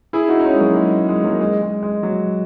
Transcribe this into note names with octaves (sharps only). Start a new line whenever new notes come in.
E4 G#4
D#4 F#4
D#4
C#4 E4
G#3
F#3 A#3
G#3
G#3
G#3
F#3 A#3
G#3
G#3
G#3
F#3